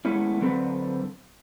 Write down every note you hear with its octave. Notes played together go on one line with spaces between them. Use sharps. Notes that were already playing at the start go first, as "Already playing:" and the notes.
G#3 A3 B3 C#4 E4
D3 F#3 C4 A4 B4